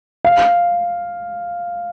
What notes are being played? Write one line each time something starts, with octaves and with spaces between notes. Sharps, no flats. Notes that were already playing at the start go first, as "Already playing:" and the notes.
F5